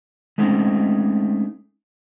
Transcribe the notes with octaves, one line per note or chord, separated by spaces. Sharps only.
G#3 A3 C4 C#4 D#4